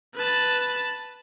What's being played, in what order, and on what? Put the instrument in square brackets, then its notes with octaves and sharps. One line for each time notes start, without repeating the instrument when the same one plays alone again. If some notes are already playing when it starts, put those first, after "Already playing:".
[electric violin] B4 A5